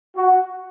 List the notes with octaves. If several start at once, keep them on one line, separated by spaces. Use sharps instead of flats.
F#4